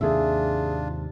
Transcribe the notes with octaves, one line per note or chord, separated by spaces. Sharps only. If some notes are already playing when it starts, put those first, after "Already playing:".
D#2 G#2 C3 D4 F4 G#4 E5